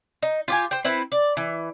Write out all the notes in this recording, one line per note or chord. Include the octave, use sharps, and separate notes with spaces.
D#4
F4 G4 G#5
C5 G5
C4 E4 B4
D5
E3